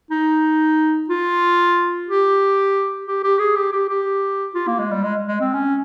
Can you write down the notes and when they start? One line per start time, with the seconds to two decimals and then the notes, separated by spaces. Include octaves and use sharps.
0.10 D#4
1.10 F4
2.08 G4
3.07 G4
3.24 G4
3.39 G#4
3.56 G4
3.73 G4
3.89 G4
4.54 F4
4.67 A#3
4.79 G#3
4.91 G3
5.03 G#3
5.28 G#3
5.40 C4
5.53 C#4